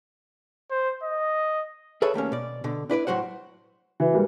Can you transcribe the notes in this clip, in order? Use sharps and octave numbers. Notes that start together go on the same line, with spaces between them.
C5
D#5
G#4 A4 B4 C#5 E5
D#2 A3 A#3 C#4
B2 D5
B2 D3
D4 E4 B4 D5
A2 F#3 F#4 C5 F#5
E3 F#4 B4
G#2 G3 A#3